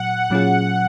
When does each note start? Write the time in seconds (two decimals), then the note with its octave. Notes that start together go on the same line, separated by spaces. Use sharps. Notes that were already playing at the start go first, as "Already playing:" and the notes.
Already playing: A#2 F#3 F#5
0.30 A#2 F#3 C#4 F4 G#4